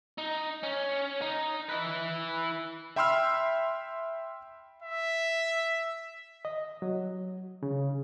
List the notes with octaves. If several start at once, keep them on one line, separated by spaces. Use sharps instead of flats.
D#4
C#4
D#4
E4 B4
E5 G5 B5 C6 E6 F6
E5
D#5
F#3
C#3